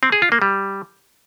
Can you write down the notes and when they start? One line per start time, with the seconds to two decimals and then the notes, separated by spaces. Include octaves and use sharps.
0.03 C4
0.12 G#4
0.22 F4
0.32 A#3
0.42 G3